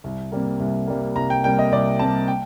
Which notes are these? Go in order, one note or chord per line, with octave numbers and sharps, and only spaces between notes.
C2
C3 G3 A#3
C2
C3 G3 A#3
C2 A#5
G5
C3 G3 A#3 G5
D#5
C2 D5
C3 G3 A#3 A5
G5